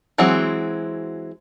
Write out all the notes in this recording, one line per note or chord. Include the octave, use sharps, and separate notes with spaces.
E3 F#3 G#3 C4 F#4